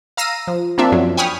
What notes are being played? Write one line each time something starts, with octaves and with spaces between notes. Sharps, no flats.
F5 A#5 E6 A#6 C7 D#7
F3
A#3 C4 D4 F4 E5
F#2 F3 F#3
G5 G#5 B5 C#6 D#6 F6